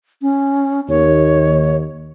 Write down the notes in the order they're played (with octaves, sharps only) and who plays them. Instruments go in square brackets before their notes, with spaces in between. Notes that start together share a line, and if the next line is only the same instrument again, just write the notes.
[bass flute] C#4
[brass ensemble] D#2 [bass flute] C#5